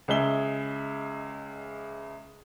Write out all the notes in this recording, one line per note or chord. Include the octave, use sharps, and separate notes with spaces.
C#2 G#3 G#4 E5 G7